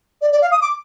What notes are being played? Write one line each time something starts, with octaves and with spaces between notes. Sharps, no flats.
D5
D5
F5
D#6
D6